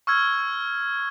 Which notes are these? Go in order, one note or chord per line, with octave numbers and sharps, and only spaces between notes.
C#6 E6 F6 G#6